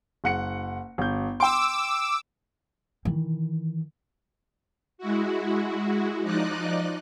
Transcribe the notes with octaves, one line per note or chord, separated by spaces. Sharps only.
F#1 F#5 C#7
G1 G6
G5 C6 D6 E6
D#3 E3
G#3 E4 F#4
F3 D#4 D5 D#5 F#6